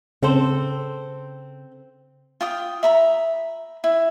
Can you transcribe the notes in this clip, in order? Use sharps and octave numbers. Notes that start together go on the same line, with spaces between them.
C#3 C4 A4 C5
F4 G5 D#6
E5 A#5 B5
E4